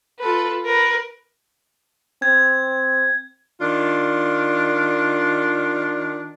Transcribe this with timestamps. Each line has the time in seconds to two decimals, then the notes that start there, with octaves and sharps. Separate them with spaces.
0.19 F4 A4 B4
0.65 A#4 B4
2.22 C4 G#6
3.61 D#3 D4 F4